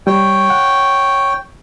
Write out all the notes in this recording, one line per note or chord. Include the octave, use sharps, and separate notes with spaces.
G3 C#5 G5
F#5